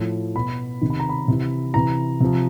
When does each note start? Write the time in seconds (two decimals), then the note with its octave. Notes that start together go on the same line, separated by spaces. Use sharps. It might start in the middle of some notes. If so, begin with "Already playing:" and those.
Already playing: A2 F3
0.35 B2 B5
0.81 C3 D#3
0.90 B5
1.00 A#5
1.09 B5
1.28 C3 E3
1.74 C3 E3 A#5
2.20 C3 F3